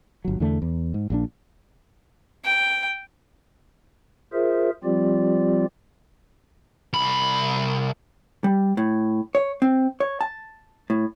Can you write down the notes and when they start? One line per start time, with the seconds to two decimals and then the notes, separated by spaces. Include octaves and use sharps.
0.25 G1 F#3
0.40 E2 D3 A3
0.62 E2
0.94 G#2
1.10 A#1 A#2 D4
2.45 G5
4.33 F4 G#4 A#4 C5 E5
4.84 F3 G3 C4 F4 G4 D5
6.93 C2 B5
8.44 G3
8.77 A2
9.35 C#5
9.62 C4
10.00 C#5
10.21 A5
10.90 A2